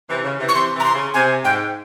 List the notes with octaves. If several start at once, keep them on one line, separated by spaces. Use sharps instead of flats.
C3 E3
C#3
C3 E3
C#6
C3 E3 C6
C3 E3
A#5
C6
C#3
C3 G#5
G#2 G5